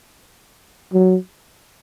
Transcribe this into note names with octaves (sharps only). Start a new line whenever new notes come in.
F#3